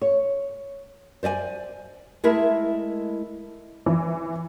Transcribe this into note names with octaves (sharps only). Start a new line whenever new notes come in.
C#5
C5 D5 E5 G#5
G#3 A3 E4 A#4 E5
E3